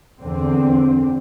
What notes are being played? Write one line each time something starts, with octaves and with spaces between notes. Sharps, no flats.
E2 D3 C4